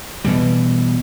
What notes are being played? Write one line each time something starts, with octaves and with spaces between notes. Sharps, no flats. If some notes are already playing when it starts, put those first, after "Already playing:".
B2 E3 G3